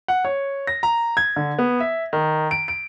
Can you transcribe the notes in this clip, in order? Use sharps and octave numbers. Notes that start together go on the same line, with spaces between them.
F#5
C#5
A#6
A#5
G#6
D3
B3
E5
D#3
D7
D7